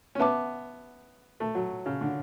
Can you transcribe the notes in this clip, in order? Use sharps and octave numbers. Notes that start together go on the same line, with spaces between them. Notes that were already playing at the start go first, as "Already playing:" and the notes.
C#4
B3 E5 A5 D6
A3
F#3
C#3
D3